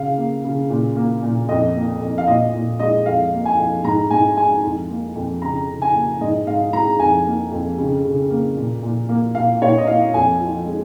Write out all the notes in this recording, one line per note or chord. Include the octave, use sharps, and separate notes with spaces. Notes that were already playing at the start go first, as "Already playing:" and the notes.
Already playing: C#3 F5
A#3
C#3
A#2
A#3
A#2
F2 D#5
A#3
F2
F5
A#2 D#5
A#2
G#3 D#5
F2 F5
A#3
G#5
F2
G#2 A#5
G#2 G#5
G#3 G#5
F2
A#3
F2
C#3 A#5
C#3
G#5
A#3
G#2 D#5
G#2 F5
G#3 A#5
F2 G#5
A#3
F2
C#3
C#3
A#3
A#2
A#2
A#3
A#2 F5
A#2 C#5
D#5
A#3 F5
F2 G#5
F3
G#3